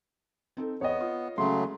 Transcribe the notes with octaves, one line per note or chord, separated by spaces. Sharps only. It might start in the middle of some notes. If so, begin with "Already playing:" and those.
C4 D#4 A4
E2 B3 C#5 D#5
F4
C#3 F#3 G#3 A3 C#4 C6